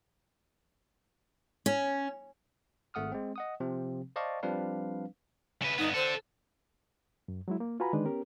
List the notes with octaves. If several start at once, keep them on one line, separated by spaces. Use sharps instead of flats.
C#4
G#1 A3 F#5 D#6 F6
G#3 C4
D#5 F#5 D#6
C3 F3 C4
C5 D5 D#5 F5 A5 C#6
F3 G3 C4 D4 B4 F5
C#3 B4
G2 B3 D#4
D4 A4 C5
F#2
F#3 G#3 E4
A#3
F4 F#4 B4 G#5 A#5 B5
D3 D#3 G#3 D4 D#4 B4
B3 C#4 G4 A#4